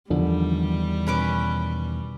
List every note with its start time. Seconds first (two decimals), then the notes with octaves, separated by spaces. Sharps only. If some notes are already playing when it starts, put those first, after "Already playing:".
0.10 E2 D3 D#3 F3 G3
1.07 B2 C#4 B4 D6